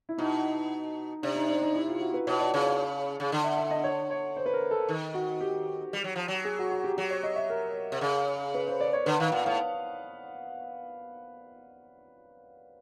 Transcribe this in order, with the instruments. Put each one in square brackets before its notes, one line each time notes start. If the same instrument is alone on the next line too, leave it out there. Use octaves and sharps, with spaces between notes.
[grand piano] E4
[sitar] B2 [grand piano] D#4
[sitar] C3 [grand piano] D4
[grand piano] D#4
D4
D#4
E4
F4
F#4
B4
[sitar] B2 [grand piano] C#5
[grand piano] D5
[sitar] C#3 [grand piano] C#5
[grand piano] C#5
[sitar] C#3
D3
[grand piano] E5
E5
D#5
C#5
C#5
C5
B4
A#4
A4
[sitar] D#3
[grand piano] F#4
G4
[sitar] G3
F#3
F3
F#3
[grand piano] G#4
F#4
F#4
G4
[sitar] F#3 [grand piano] G4
[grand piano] C#5
D#5
E5
A#4
[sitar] C3
C#3
[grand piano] B4
C5
D5
C#5
[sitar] D3 [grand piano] B4
[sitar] D#3 [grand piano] F5
[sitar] A#2 [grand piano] F#5
[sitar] A2 [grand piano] F5